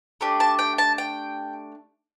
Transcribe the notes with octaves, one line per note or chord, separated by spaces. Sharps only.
A3 D4 G4
A5
G5
A5
G5